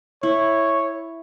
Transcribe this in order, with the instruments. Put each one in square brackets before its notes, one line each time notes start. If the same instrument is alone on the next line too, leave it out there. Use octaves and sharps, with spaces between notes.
[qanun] E4 [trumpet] C#5